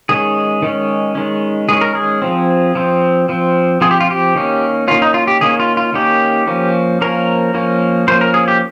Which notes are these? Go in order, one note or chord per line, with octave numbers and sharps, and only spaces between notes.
D#3 G#3 C#4 G#4
D#3 G#3 C#4
D#3 G#3 C#4
D#3 G#3 C#4 G#4
A#4
G#4
F3 C4
F3 C4
F3 C4
F3 C4 G#4
G4
F4
G4
D#3 A#3 C#4
D#3 A#3 C#4 F4
D#4
F4
G4
D#3 A#3 C#4 G#4
F4
F4
D#3 A#3 C#4 G4
F3 A#3 C#4
F3 A#3 C#4 A#4
F3 A#3 C#4
F3 A#3 C#4 C5
A#4
G#4
G4